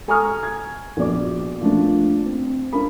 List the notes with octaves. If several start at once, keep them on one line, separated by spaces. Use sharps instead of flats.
A4 G#5 A#5 C#6 D#6 F6
G#6
A#1 B2 D5 D6
F3 A3 A#3 D4
C4
D4 F4 A#4 B5